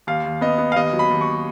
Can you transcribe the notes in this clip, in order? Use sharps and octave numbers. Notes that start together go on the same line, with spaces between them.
D#2 F5
D#2
B3 D#5
B3
F5
D#2 D#5
F#3
B5
D#2
C#6